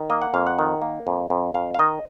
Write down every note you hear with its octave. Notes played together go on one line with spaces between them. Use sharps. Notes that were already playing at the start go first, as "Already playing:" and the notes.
Already playing: D#3
A#3 D#5
F#5
F2 F5
F#5
D#3
A#3
F2
F2
F2 F5
F5
D#3 D#5